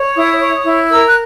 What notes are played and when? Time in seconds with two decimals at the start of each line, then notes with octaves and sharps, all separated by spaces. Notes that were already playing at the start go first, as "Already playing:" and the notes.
Already playing: C#5
0.16 E4 D#6
0.41 C#5
0.65 E4
0.90 A#4 E6
1.07 F#6